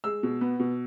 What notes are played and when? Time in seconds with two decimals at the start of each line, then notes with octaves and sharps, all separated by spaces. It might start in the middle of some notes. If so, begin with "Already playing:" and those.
0.04 G#3 E6
0.23 B2
0.41 B3
0.60 B2